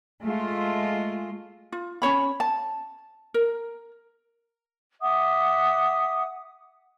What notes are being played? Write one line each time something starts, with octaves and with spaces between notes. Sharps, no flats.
G#3 A3 F4
F4
C#4 D#4 C#5 B5
A5
A#4
E5 F#5 D6 D#6